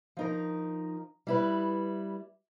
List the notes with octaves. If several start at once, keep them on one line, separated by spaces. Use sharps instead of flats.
F3 D#4 A#4
G3 E4 B4